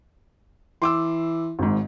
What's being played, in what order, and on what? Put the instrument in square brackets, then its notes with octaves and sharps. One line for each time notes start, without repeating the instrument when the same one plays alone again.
[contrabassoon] E3 [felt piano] C6 D6 E6
[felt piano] G#1 G#2